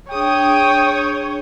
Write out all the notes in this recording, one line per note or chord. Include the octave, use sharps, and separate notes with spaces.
D4 G#4 C#5 G5 D#6